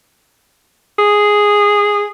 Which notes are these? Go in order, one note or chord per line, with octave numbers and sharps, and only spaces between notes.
G#4